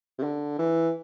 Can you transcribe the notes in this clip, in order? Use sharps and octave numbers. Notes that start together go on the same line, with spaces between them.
C3
D3
E3